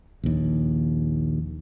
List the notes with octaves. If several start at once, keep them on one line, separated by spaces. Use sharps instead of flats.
A#1 D#2